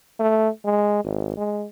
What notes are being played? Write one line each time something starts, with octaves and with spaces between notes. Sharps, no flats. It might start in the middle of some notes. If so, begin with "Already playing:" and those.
A3
G#3
G#1
G#3